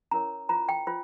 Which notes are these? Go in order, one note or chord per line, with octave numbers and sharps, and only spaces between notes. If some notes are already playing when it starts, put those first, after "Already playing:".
C#4 E4 A#4 C#5 A#5
F4 C5 A#5
G5
F4 C5